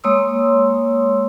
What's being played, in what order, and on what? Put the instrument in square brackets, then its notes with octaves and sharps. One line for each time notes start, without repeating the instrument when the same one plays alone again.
[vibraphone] G#3 A#3 C#5 C6 D#6 E6